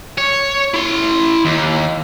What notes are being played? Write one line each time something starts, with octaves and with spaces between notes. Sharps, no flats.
C#5
E4 C6
D#2